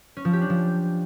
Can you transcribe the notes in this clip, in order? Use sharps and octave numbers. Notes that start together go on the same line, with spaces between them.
C#4
F3
G4
D4
F3